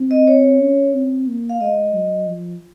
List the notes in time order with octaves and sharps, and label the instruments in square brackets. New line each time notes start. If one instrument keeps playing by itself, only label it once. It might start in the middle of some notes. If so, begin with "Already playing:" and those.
Already playing: [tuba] C4
[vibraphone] D#5
C#5
[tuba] C#4
C4
A#3
[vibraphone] F5
[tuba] G#3 [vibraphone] D#5
[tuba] F#3
F3